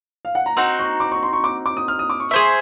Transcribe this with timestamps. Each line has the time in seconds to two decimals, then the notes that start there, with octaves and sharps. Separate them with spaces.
0.25 F5
0.35 F#5
0.46 A#5
0.57 C4 D#4 F#4 C6
0.79 C#6
1.00 D6
1.12 C#6
1.23 C6
1.33 C#6
1.44 D6
1.66 D6
1.77 D#6
1.88 F6
1.99 D#6
2.10 D6
2.20 C#6
2.31 G#4 C5 E5 C#6